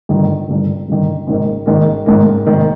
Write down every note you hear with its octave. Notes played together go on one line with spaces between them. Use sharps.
G1 G2 D#3
G1 G2 D#3
G1 G2 D#3
G#1 G#2 D#3 A#3
G#1 G#2 D#3 A#3
G#1 G#2 D#3 A#3
G#1 G#2 D#3 A#3